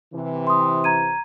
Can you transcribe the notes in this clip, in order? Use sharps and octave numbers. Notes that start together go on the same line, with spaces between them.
C3 E3
C6 D#6
A#5 G#6 D#7